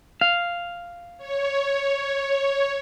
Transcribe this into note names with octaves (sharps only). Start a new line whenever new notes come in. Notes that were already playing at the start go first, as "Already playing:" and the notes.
F5
C#5